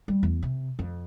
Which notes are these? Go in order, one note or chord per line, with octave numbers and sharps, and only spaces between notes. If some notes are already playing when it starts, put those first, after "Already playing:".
G3
E2
C3
F2